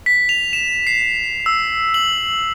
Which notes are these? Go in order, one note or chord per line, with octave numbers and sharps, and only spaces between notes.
B6
F7
E7
C7
E6
F#7